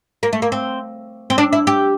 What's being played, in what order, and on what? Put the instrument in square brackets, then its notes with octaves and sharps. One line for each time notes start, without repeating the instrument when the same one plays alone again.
[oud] A#3
A3
A#3
C4
C4
D4
E4
G4